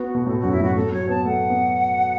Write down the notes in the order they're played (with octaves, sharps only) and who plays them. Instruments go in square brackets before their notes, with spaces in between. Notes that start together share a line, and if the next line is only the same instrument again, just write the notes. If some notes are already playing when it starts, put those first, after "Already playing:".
Already playing: [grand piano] B3 [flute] F#4
[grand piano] B2
[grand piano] A2 [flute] A4
[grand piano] F#2 [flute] F#4
[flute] E4
[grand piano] A2
[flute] F#4
[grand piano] A2 [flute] A4
[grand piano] F#3 [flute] C#5
[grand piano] B3 [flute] A5
[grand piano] A3 [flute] F#5
[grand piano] B3